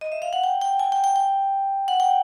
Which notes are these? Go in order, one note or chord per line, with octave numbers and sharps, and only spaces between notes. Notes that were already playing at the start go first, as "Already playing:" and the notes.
D#5
E5
F5
F#5
G5
G5
G#5
G5
G5
G5
F#5
G5